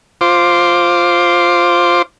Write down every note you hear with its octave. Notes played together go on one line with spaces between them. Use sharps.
F4 C5 D6